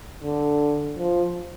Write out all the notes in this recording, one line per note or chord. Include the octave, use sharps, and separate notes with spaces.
D3
F3